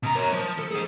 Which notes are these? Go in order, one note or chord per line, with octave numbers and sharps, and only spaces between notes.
B2 A#5
A#4 C#5
F3
A4
G#4 C5